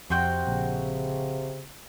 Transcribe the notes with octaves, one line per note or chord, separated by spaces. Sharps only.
F2 C3 C4 F#4 G5
A#1 C#3